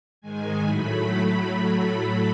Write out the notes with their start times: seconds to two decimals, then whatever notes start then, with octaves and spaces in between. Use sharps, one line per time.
0.21 G#2 D#3 G#3 G#5
0.61 A2 F#3 A3 B5
1.02 A2 F#3 A3